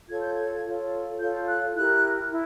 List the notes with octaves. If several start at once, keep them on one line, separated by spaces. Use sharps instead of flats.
F4 A4 C#5 G#6
G6
G#6
F4 A4 C#5
F4 A4 C#5 G6
F#6
E4 G4 A#4 F#6
E4